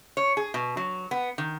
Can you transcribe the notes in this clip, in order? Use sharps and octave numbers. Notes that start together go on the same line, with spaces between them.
C#5
G#4
B2
F#3
B3
D#3